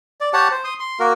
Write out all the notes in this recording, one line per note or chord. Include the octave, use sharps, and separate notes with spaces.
D5
G4 C#5 F#5 A5
C5
C6 D#6
C6
A#3 F#4 A#4